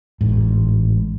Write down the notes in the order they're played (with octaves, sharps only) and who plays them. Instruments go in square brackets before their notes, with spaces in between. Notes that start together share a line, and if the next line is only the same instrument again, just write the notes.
[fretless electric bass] A1 G#2